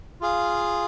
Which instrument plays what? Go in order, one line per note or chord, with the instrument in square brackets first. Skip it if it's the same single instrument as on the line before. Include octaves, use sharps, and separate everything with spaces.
[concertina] F4 G#4 F5